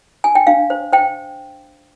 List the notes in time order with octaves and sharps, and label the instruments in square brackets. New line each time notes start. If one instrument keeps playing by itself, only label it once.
[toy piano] G#5
G5
D4 F5
C5
C5 G5